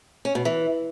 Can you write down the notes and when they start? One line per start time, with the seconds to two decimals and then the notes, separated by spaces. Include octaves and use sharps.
0.25 C#4
0.35 B2
0.45 E3